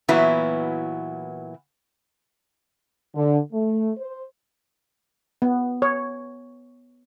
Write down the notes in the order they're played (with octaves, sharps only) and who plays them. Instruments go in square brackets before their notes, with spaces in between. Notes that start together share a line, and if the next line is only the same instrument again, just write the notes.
[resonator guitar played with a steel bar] A#2 E3 F#3 B3 E4 F#4
[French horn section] D3
A3
C5
[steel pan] B3
C#5